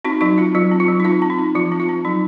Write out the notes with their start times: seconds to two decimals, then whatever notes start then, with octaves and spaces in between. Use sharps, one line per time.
0.04 C4 D#4 F#4
0.21 F#3 D#4 F#4
0.38 C4 F4
0.55 F#3 F4
0.71 C4
0.80 F4
0.88 F#3
1.00 D#4
1.05 C4 F4
1.22 C4
1.30 D#4
1.38 C4
1.55 F3 F4
1.72 C4
1.80 F4
1.89 C4
2.05 F#3 D#4